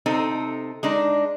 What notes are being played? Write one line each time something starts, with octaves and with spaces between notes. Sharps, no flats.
C3 C4 D#4 A4
G#3 D4 D#4